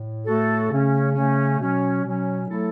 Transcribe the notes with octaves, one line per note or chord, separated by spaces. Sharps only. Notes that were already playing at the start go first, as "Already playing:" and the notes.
Already playing: A2
A2 A3 F#4 A4
C#3 A3 C#4
C#3 A3 C#4
B2 F#3 C#4
B2 F#3 C#4
F#3 A3 E4 A4